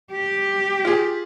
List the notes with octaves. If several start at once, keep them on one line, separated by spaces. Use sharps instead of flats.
G4
F4 G#4